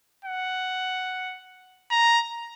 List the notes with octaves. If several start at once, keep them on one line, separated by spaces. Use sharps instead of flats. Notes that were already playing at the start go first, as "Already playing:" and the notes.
F#5
A#5